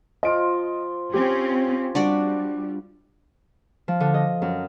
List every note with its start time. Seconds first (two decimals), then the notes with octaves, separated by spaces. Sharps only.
0.23 F3 F4 D#5 D7
1.13 C4 C#4 G4
1.95 G3 D4 F#4 D5
3.88 F3
4.00 D3
4.14 D#5
4.42 F#2